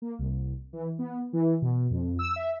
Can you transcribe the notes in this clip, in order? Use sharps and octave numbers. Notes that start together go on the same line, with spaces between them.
A#3
C2
E3
B3
E3
B2
F2
E6
E5